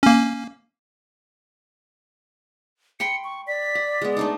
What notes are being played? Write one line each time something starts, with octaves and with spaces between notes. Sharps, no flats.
A#3 C#4
G5 B5 C6 C#7
C#6
D5 B6
F#5
G#3 B3
A3 D4 D#4